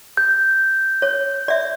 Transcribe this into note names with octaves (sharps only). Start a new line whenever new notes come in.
G6
C#5
D5 E5